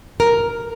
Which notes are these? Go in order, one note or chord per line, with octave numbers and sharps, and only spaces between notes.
A#4